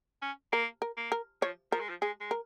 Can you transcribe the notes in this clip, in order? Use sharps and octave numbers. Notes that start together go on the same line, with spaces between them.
C#4
A#3 A#4
A#4
A#3
A#4
F3 C#5
F3 A#4
G#3
F3
G#3 G#4
G#3
A#4